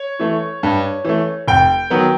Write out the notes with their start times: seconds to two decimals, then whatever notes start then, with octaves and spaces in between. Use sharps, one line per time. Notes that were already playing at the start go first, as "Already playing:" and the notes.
Already playing: C#5
0.20 E3 A3
0.63 G2
1.05 E3 A3
1.48 F1 G5
1.90 D#3 F#3 B3